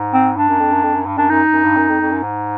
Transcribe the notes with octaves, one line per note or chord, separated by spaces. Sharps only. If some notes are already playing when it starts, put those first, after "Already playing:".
Already playing: G#2
C4
G2 D4
F#2
F2
F#2
F2
F#2
G2
F#2 D4
F#2 D#4
F#2
G2
F#2
F2
F2
F#2
G#2